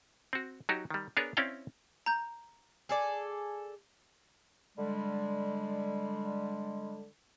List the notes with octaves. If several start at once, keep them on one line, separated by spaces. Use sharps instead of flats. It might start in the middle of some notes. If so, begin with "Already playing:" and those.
C4 F#4
F#3 D#4 F#4 G4
D#3 G3
B3 D4 G#4 A#4 C#5
C4 C#4 E4 D5 F5 G5
A#5 G6
G#4 A4 D5
D3 G3 G#3